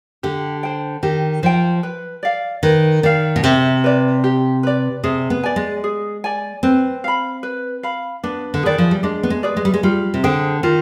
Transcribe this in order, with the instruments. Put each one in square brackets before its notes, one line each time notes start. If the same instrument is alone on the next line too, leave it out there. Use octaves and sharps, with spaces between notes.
[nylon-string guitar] D3 [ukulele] G4
[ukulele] C5 G5
[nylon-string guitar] D#3 [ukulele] G4
[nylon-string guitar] F3 [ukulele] C5 G5
[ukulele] B4
D5 F5
[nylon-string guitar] D#3 [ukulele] B4
[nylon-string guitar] D#3 [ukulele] D5 F5
[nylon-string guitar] B2
[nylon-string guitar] C3 [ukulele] G4
[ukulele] B4 D5
G4
B4 D5
[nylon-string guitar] C3 [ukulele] G#4
[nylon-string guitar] B3
[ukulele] D5 G#5
[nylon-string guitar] G#3
[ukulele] G#4
D5 G#5
[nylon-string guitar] C4 [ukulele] B4
[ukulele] F5 B5
B4
F5 B5
[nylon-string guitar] B3 [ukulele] D4
[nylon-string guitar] D3
[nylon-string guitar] D#3 [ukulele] G#4 B4 D5
[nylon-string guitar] F3
G3
[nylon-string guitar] G#3 [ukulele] D4
[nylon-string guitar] B3
G#3
[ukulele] G#4 B4 D5
[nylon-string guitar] G#3
G3
G#3
[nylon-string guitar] G3 [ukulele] F4
[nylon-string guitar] C3
[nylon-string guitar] D3 [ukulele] G#4 C5 G5
[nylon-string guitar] D#3 [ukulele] F4